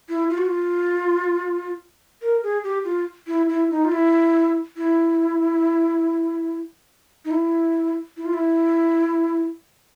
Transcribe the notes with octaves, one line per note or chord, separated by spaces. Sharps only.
E4
F4
F#4
F4
A#4
G#4
G4
F4
E4
E4
D#4
F4
E4
E4
D#4
E4
E4
F4
E4